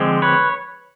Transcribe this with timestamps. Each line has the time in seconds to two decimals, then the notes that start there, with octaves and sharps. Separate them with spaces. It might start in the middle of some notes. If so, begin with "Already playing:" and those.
Already playing: D3 F3 G#3 C4 G#4
0.22 B4 C#5